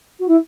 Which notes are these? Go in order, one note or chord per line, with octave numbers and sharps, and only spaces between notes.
F#4
E4